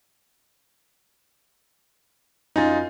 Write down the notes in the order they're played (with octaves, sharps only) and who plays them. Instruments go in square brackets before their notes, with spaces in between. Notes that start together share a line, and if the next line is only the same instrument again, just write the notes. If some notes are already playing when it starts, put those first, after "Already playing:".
[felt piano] F#2 G#5 A6 [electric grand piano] D#4 F4